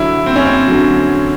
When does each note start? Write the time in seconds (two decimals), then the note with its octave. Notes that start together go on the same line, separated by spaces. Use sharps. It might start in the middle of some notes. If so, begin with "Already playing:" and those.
Already playing: D3 F#3 E4
0.26 C4
0.36 C#4
0.45 C4
0.68 D3 F#3